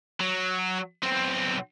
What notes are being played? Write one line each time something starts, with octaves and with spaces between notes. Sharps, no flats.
F#3
B1 C4